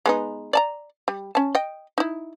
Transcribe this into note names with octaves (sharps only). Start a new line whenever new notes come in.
G#3 B3 D#4
D5 A5 A#5
G3
C#4 A5
D#5 G5
D#4 E4